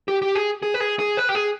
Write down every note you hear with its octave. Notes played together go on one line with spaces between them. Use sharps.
G4
G4
G#4
G#4
B4
G#4
G#4
B4
G4
G#4